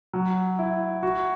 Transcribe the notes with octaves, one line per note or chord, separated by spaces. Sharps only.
F#3
E4
F#4